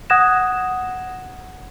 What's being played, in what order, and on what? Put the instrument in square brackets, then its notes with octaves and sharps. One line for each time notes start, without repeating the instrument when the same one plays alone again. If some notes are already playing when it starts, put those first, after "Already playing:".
[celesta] F#5 D#6 F#6 G#6 A#6 E7